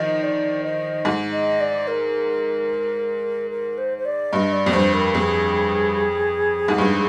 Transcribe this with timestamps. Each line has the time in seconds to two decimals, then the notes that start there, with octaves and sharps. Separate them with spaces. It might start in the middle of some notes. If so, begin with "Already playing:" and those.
Already playing: D#3 F3 D#5
0.23 D5
0.64 D#5
1.05 G#2
1.33 D#5
1.60 D5
1.88 A#4
3.51 A#4
3.78 C5
3.98 C5
4.05 D5
4.32 G2 D#5
4.52 D5
4.66 F2
4.73 G2 C5
4.94 A#4
5.14 F2 G#4
6.68 G#2
6.78 G2